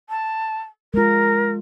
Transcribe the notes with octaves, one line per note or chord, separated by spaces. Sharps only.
A5
G#3 F4 A#4